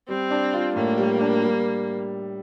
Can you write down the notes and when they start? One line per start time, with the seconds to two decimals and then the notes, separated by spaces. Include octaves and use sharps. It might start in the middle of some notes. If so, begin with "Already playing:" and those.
0.09 G3 C4
0.31 D4
0.53 F4
0.75 A2 A#3
0.98 G3
1.21 D4
1.43 G3